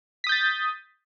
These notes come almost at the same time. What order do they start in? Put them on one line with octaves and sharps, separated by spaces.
B6 D#6 G6 A6